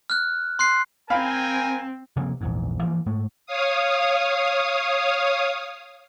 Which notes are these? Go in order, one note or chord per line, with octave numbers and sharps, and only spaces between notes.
F6 F#6
C6 F#6 C7
C4 A#4 F5 G5 G#5 B5
C3 F3 A#3 C4
A#1 E2 G#2
E3 F3 A#3
G#2 A3
C#5 F5 D#6